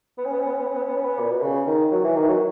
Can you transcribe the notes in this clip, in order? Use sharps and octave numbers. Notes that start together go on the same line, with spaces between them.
B3
C#4
B3
C#4
B3
C#4
B3
C#4
B3
C#4
B3
C#4
B3
A#2
B2
C#3
D#3
F#3
E3
D#3
F#3